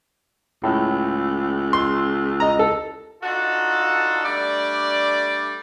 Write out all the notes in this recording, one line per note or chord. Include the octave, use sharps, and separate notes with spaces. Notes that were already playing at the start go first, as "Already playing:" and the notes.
C#2 A2
C6
D#5 A#5
A4
D4 D#4 F4 F#4 A4
G3 A3 D4 D5